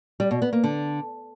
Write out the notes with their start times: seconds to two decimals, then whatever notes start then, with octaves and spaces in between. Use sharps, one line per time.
0.20 G3
0.31 B2
0.42 B3
0.53 A#3
0.64 D3